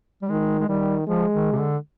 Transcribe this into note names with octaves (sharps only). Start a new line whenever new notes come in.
G3
D#3 G#3
G#3
D#3 G3
F3 G#3
D#3
C3
D3